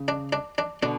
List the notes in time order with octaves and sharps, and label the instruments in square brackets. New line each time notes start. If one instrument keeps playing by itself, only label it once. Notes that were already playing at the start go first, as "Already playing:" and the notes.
Already playing: [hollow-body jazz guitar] C#3
[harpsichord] D4
D4
D4
[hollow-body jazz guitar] B2 D3 [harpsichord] D4